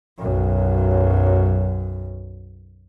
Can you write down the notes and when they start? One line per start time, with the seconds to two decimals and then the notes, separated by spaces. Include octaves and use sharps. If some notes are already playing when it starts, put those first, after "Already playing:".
0.17 B1 F#2